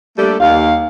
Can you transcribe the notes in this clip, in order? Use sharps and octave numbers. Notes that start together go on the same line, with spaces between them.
G3 A3 A#3 D4 A4 D5
D#2 F5